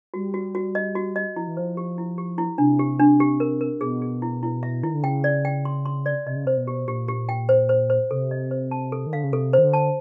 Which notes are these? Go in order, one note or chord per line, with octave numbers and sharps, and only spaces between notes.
G3 F#4
F#4
F#4
D#5
F#4
D#5
F3 E4
E3
F3 C5
G4
E4
G4
E4
C3 D4
G4
D4
G4
A#4
A#4
B2 G#4
G#4
E4
E4
E5
D#3 E4
D3
C#3 G5
D5
G5
C6
C6
D5
C3 D#5
C#3
C3 C5
B2
G4
A#2 G4
G4
G5
C5
C5
C5
C3 A4
D#5
C5
A5
A4
D#3
D3 F5
C#3
C3 A4
D#3 C5
D3
A5